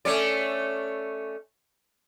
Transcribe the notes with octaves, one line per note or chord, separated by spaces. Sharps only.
A3 C#4 D5